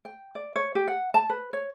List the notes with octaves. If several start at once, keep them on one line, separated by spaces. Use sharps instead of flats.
G5
D5
C#5
G4
F#5
A5
B4
C#5